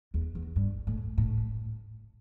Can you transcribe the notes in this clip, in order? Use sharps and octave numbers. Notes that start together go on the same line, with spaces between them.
E2
E2
G2
A2
A2